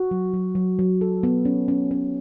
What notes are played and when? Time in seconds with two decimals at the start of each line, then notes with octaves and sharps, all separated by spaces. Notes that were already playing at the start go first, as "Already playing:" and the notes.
Already playing: F#4
0.11 F#3
0.34 F#3
0.55 F#3
0.79 F#3
1.01 A4
1.23 B3
1.45 C#4
1.68 C#4
1.91 C#4